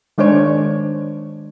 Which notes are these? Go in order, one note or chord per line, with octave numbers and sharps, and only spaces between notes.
D#3 G#3 D4 C5 C#5